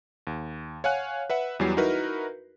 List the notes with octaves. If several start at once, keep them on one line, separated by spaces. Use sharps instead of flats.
D#2
C#5 F5 F#5 G#5 F#6
B4 E5 F#5
E2 E3 F#3 G3 C7
D#4 E4 F#4 A#4 B4